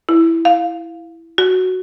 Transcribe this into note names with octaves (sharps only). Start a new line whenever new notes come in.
E4
F5
F#4